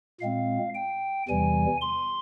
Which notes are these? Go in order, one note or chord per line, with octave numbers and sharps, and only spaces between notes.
A#2 G#3 C4 F5
G5
E2 C3 E3 G3 G#5
C6